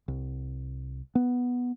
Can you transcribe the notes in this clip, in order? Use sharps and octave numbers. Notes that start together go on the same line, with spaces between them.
C2
B3